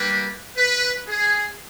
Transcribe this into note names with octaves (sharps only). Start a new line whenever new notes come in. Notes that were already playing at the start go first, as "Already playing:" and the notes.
Already playing: G3 A#3 D4 G4 B4
B4
G#4